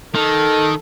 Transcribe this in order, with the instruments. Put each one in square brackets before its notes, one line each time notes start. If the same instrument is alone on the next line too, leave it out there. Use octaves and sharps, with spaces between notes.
[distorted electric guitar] D#3 [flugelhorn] A4